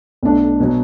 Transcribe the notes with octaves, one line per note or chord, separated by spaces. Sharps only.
B1 B2 A3 D4
B2 F#3